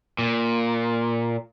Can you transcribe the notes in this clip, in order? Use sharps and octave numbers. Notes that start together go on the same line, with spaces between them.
A#2